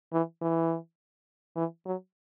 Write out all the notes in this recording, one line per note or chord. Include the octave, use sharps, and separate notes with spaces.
E3
E3
E3
F#3